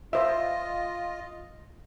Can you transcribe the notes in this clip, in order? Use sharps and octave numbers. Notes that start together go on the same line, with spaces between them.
F4 C5 D#5 E5